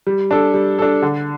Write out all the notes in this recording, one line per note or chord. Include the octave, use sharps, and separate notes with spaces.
G3
D4 A4
G3
D4 A4
D3